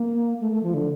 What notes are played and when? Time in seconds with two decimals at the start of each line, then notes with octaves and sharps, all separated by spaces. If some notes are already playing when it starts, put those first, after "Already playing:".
Already playing: A#3
0.41 A3
0.51 A3
0.63 F3
0.74 D3